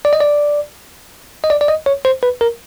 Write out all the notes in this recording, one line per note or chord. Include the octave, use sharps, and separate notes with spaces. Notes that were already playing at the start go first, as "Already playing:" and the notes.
D5
D#5
D5
D#5
D5
D5
D#5
C#5
C5
B4
A#4